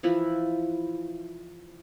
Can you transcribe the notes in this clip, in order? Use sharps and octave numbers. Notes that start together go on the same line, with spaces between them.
E3 F3 E4